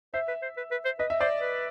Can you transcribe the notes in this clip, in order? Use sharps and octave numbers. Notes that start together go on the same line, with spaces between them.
C5 E5
B4
C5
B4
B4
C5
B4 D#5
E5
C5 D5
B4